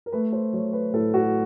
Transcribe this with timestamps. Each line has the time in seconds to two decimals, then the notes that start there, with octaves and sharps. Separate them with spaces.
0.06 A#4
0.12 A3 B4
0.32 C5
0.53 F#3 C#5
0.73 B4
0.93 A2 A4
1.14 F#4